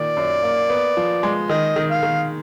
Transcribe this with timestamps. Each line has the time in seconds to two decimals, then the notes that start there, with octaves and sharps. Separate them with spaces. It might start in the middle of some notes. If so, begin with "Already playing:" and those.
Already playing: A#2 D#3 D5
0.17 F#2
0.43 A#3
0.70 B3
0.97 F3
1.23 G#3
1.49 D#3 D#5
1.76 D#3
1.90 F5
2.03 D#3